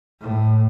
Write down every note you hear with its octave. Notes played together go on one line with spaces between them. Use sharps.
A2